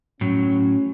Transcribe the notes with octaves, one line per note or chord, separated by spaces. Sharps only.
A2 F#3 C#4